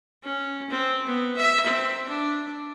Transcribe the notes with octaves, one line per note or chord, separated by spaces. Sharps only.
C#4
C4
B3
E5
C4
D4